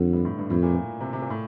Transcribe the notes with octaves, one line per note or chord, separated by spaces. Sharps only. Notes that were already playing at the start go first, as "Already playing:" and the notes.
Already playing: F2 D3
G2
A2
G2
F2 A2
A#2
A#2
C3
C3
A#2
A2